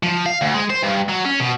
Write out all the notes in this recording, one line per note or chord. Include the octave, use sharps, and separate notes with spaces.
F3
F5
D2
G#3
C5
G2
F#3
C#4
B2